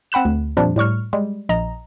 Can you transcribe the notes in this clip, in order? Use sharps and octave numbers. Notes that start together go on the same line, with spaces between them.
C4 F#5 B5 F#6 E7
D2
F2 A#2 F3 G3 D4
A2 G3 C#6 F6
G3 G#3
A#1 D#5 A#5